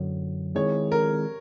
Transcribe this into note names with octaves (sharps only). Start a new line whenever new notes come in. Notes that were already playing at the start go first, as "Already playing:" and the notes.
Already playing: F#2 D3 F#3
D#3 G#3 C4 E4 G#4 C#5
A#4